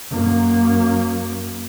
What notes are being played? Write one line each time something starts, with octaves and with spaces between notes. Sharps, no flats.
F#2 A#3